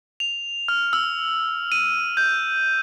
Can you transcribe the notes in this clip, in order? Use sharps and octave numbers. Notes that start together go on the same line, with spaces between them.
F7
F6
E6
D#7
G6